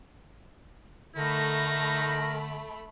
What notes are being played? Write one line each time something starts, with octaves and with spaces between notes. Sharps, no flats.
D3 A3 D#4 A#4 B5